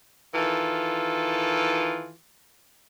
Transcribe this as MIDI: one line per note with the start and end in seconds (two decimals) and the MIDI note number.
0.34 2.13 51
0.34 2.13 52
0.34 2.13 65
0.34 2.13 69